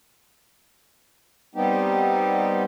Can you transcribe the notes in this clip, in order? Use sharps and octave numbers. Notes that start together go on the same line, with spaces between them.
G3 B3 C4 D#4 G4